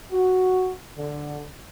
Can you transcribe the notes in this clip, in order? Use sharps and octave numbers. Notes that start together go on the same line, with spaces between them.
F#4
D3